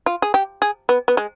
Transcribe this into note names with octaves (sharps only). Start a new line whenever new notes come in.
F4
G#4
G4
G#4
B3
B3
G#3